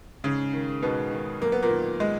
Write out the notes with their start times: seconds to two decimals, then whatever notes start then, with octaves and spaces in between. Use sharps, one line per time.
0.24 G#2 C#3 C#4
0.53 D#3
0.82 G#2 B2 B3
1.12 D#3
1.41 F#2 A#3
1.52 B3
1.63 A#2 A#3
1.71 D#3
2.00 G#3